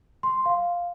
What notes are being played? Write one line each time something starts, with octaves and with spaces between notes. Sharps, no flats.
C6
F5